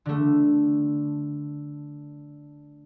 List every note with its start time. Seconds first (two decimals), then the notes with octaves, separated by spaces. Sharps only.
0.06 D3 A3